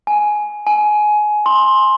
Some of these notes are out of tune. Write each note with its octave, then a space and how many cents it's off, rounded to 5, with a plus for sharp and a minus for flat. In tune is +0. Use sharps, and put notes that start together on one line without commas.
G#5 +10
G#5 +20
C6 +15